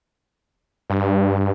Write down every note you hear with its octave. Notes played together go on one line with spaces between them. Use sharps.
G2